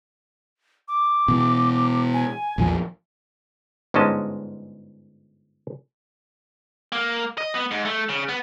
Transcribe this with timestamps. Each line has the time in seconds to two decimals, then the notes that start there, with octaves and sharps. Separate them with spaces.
0.88 D6
1.28 B2 E3
2.14 G#5
2.58 A#1 E2 F3
3.94 G1 G#2 G#3 C#4 D#5 A5
6.92 A#3
7.38 D#5
7.54 B3
7.71 G#2
7.85 A3
8.09 C#3
8.29 B3